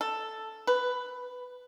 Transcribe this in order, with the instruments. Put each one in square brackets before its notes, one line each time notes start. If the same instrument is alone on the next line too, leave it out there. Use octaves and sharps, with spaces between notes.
[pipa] A4
B4